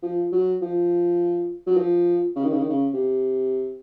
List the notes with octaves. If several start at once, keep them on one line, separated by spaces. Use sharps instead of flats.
F3
F#3
F3
F#3
F3
C#3
D#3
C#3
D#3
C#3
C3